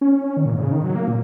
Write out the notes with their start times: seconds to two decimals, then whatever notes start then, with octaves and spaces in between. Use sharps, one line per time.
0.01 C#4
0.12 C#4
0.24 C#4
0.37 D#3
0.45 A#2
0.54 G#2
0.62 C#3
0.72 D#3
0.84 F#3
0.95 A#3
1.08 A#2